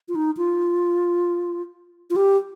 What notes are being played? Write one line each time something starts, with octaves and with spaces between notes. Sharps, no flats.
F4
D#4
F4
F4
G4